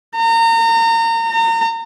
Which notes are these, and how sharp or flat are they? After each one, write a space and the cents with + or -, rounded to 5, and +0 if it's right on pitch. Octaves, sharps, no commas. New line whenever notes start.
A#5 -30
A#5 -35